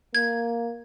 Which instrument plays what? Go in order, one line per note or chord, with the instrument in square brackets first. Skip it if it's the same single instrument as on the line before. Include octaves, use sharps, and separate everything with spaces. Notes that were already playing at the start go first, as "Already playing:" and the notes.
[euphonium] A#3 [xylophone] G#6